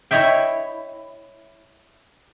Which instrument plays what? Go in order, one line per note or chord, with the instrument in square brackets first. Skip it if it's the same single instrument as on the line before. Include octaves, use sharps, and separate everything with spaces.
[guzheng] E4 C#5 D#5 E5 G5